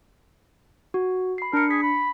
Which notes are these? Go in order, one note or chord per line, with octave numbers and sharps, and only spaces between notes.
F#4
B5 C7
D4 A#4 C#7
G#4 B6
B5